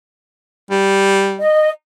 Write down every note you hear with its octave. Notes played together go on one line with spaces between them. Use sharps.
G3
D#5